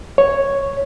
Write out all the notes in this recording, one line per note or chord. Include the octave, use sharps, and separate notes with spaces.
C#5